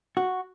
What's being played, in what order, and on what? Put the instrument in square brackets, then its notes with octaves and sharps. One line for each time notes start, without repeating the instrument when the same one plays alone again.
[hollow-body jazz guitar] F#4